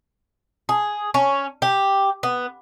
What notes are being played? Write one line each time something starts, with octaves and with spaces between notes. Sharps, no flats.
G#4
C#4
G4
B3